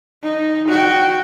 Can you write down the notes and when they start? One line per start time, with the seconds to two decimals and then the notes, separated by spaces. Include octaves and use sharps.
0.23 D#4
0.68 F#4 G5